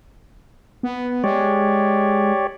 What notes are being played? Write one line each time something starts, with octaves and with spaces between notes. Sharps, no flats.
B3
G#3 G4 C#5 D5